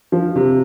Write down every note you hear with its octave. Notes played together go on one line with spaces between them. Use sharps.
F3
C3